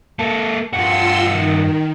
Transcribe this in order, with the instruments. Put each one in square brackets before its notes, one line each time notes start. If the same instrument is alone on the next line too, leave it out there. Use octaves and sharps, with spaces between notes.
[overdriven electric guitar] A#3 A4
[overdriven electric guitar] G2 F#4 [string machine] F4 C6 E6
[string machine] D#3